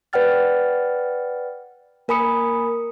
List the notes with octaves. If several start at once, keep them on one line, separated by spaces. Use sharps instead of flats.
B4 D5 F#5 G5 F6 A6
A#3 A#4 G#5 B5 D#6 C#7